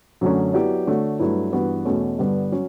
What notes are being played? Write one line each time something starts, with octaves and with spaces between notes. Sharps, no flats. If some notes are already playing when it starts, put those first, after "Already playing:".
F#2 D3 F#3 A3 C#4
F#3 B3 E4 G4 D5
D3 A3 D4 F#4 C#5
G2 F#3 A3 E4 B4
G2 E3 B3 F#4
E2 B2 A3 C#4
G2 D3 G3 B3
F#3 C#4